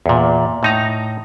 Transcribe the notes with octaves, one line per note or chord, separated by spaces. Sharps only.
E2 A#2
A2 D#4 A#5